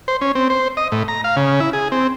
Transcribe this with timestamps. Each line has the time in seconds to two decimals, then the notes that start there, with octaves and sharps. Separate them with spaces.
0.08 C5
0.21 C#4
0.35 C4
0.50 C5
0.77 D#5
0.92 A2
1.08 A#5
1.24 F5
1.36 C#3
1.60 E4
1.73 G#4
1.92 C4